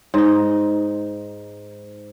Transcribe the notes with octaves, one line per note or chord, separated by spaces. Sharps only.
G#2 D#4